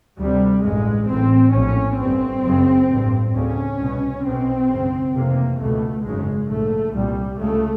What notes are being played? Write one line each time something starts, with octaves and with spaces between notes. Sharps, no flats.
D2 C3 G3
A1 G2 G#3
A1 A2 C4
A#1 A2 C#4
G1 G2 C4
F#1 F#2 C#3
A1 G2
D2 C#3 C#4
C2 B2
B1 B2 C4
G#1 F#2 C#3
F1 E2 C3 A#3
C#2 B2 A3
G#1 F#2 C#3 G#3
A#1 G#2 A3
C2 A#2 G3
C#2 C#3 A3